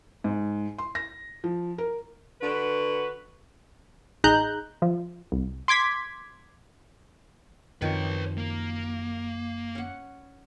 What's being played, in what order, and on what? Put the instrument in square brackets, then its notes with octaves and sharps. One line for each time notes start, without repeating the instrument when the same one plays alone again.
[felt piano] G#2
C6
A#6
F3
A#4
[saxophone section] D3 F#4 B4
[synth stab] A1 D#4 G#4 A#5 F#6 G6
F3
C2
C6 D6 G#6 B6
[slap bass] F#2 [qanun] D#3 F3 C4 [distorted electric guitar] B4 C#5
[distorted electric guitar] A#3
[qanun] C#4 F#5